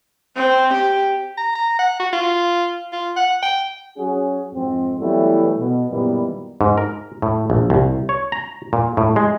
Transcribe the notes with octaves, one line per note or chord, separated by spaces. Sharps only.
C4
G4
A#5
A#5
F#5
F#4
F4
F4
F#5
G5
F#3 C#4 F#4 G#4
F2 G#2 C4
E3 F#3 G3 A3 B3 E4
B2
F#2 A#2 D#3 E3 G3 B3
G#2
A#4
A2
A#1
C2
C#5
A#5
A#2
A2
G#3